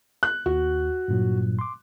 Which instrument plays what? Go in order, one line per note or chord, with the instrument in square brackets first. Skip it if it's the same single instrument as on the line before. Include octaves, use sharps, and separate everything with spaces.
[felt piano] F#6
[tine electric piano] D#2 [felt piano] F#4
[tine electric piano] G2 A#2 F#3
C6 D6